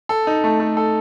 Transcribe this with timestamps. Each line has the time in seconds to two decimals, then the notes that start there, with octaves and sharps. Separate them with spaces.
0.09 A4
0.27 D#4
0.44 A3
0.60 A3
0.77 A4